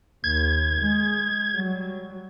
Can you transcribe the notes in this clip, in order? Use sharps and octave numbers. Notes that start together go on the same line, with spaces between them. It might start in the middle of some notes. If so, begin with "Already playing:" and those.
D#2 G#6
G#3
F#3 G3